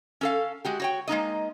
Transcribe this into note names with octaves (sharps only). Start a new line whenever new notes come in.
C#4 A4 F5
G#3 F#4 G4
F#4 C#5 G5
G#3 A#3 D#4 D#5